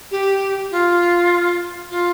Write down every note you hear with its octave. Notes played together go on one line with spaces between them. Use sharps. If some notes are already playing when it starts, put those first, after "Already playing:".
G4
F4
F4